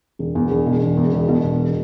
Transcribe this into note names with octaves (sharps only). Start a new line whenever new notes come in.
E1
E2
E1
B2
E1
E2
E1
B2
E1